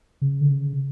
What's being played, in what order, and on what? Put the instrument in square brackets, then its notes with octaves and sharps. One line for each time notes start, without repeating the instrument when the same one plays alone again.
[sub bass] C#3
D3
C#3